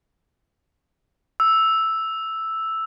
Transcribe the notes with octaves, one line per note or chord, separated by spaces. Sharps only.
E6